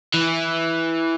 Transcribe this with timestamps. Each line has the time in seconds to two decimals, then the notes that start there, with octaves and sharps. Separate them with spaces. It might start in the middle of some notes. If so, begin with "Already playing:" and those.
0.14 E3